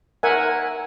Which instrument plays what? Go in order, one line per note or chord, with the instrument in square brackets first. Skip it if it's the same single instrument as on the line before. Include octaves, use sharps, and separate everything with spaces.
[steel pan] A#4 E5 F#5 G#5